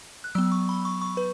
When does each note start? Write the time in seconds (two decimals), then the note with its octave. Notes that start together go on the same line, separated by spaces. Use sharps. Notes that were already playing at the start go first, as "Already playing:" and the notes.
0.24 F#6
0.35 F#3 B3 E6
0.52 C#6
0.69 B5
0.85 C#6
1.02 C#6
1.17 B4